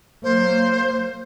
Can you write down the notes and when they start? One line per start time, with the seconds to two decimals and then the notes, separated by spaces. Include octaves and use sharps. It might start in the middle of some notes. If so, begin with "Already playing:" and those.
0.23 F#3 A#3 C5